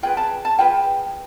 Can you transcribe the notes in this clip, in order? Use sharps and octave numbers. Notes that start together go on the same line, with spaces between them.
F4 G#4 B4 G5
A5
A5
F4 G#4 B4 G5